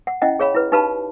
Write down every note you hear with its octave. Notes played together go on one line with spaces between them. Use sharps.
F#5
C#4 E4 D#5 F#5 G5
G#4 C#5 F5 B5
E4 B4
D#4 G4 B4 F5 A5 B5